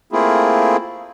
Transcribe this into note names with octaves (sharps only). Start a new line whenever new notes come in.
A3 A#3 C4 E4 F4 G#4